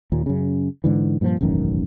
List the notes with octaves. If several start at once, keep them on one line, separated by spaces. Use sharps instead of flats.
D#2 A#2
F#2 C#3
G#2 D3 E3
G2 A#2 C#3 F3
E1 A1 F#2 D#3